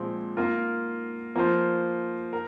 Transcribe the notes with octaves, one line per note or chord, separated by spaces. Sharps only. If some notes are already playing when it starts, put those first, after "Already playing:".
Already playing: A#2 F3 G#3 C4
A#3 F4 A#4
F3 A#3 F4 C5
A#4